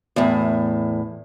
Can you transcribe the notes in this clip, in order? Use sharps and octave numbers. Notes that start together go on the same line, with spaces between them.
E2 A2